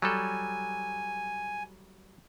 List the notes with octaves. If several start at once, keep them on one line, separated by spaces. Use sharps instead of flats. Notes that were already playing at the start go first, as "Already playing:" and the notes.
F#3 G3 A4 G#5